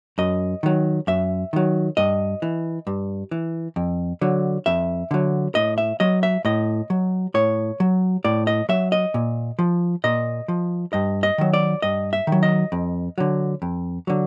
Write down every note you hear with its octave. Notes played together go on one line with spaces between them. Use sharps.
F#2 D#5
D#3 F#3
F#2 E5
D#3 F#3
G2 D#5
E3
G2
E3
F2
D3 F#3
F2 E5
D3 F#3
A2 D#5
E5
F#3 D#5
E5
A2 D#5
F#3
A2 C#5
F#3
A2 D5
D#5
F#3 E5
D#5
A#2
F3
A#2 D#5
F3
G2 D#5
D#5
D#3 F#3
D5
G2 D#5
E5
D#3
F#3
D#5
F2
D3 F#3
F2
D3 F#3